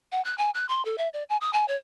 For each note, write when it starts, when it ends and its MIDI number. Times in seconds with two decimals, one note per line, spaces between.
0.12 0.23 78
0.25 0.37 90
0.38 0.50 80
0.54 0.68 90
0.69 0.84 84
0.85 0.96 69
0.98 1.09 76
1.13 1.23 74
1.29 1.37 80
1.41 1.51 87
1.53 1.66 80
1.68 1.76 73